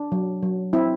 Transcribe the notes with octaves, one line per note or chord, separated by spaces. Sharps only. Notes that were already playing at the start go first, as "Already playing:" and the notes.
Already playing: D4
F#3
F#3
C4 E4